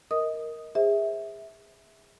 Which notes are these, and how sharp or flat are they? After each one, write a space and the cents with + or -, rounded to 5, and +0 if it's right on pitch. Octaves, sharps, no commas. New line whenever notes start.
A#4 +0 D#5 +15 D#6 +0
G#4 -30 C5 +0 E5 -15